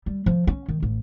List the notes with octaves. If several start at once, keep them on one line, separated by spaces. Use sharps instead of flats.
G3
F3
C#4
D#3
A1